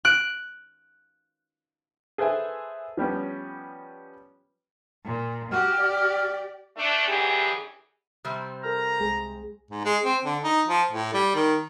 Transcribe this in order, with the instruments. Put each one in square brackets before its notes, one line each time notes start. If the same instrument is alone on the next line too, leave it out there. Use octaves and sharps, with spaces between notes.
[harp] F#6 D7
[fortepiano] G#4 A4 B4 C5 E5 G#5
F3 G3 B3 C#4
[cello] A#2
[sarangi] F#4 [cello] G4 [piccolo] F6
[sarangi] D5
[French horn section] A3 D4
F#2 D3 E3 G4 G#4
[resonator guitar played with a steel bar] C3 G3 C4
[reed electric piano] A4 A#4 F6 [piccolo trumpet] A#5
[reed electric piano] C2 G#3 G#4
[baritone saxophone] G#2
G#3
C4
D3
D#4
F3
A2
G3
D#3